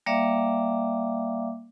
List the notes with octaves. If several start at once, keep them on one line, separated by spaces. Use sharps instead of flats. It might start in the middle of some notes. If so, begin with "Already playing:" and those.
G3 A#3 D5 E5 F5 D6